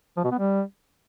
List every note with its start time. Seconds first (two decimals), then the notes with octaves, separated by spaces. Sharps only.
0.17 F3
0.24 B2
0.31 B3
0.39 G3